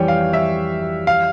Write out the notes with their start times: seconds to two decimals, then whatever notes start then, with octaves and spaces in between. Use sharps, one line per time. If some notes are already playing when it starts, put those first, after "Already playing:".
Already playing: F2 E3 G3 C#4 C#5 G5
0.08 F5
0.33 E5
1.07 F5